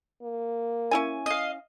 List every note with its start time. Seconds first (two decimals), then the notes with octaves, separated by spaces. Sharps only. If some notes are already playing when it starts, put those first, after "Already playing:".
0.23 A#3
0.91 C#4 E4 G#5
1.26 D#5 F5